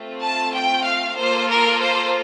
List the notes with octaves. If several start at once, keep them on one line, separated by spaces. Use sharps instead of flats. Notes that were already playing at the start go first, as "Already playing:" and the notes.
Already playing: A3 C4 F4
A5
G5
F5
A#3 F4 A4 C5
A#4
C5